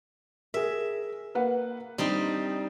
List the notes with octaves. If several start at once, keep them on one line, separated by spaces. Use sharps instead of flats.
G#4 A#4 E5
A#3 B4 F#5
G3 C4 D4 D#4